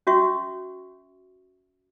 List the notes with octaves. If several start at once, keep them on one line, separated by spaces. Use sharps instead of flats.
C#4 F#4 E5 C#6